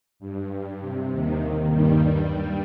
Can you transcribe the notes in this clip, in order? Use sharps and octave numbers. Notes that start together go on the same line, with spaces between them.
G2
C3
D#2 D#3
G2 G3
G2 G3
G2 G3